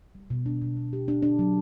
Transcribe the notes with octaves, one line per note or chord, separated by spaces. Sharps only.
G3
B2
D4
B2
B2
G4
D4
D4
F#3